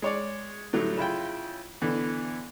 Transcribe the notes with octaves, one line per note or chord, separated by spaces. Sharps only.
G#3 C#5 D5
A2 D3 F#3 G3 A3
C#3 E4 F4 G5
B2 D3 E3